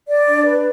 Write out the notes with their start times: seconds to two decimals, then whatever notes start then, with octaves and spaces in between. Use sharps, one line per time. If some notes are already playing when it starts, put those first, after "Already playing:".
0.08 D5
0.27 D4
0.46 B4